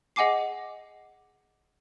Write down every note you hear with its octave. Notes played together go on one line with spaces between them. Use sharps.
G#4 D#5 F#5 G#5 D6 C7